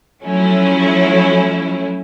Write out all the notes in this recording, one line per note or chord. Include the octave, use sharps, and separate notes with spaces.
F3 F#3 A3 C#4 E4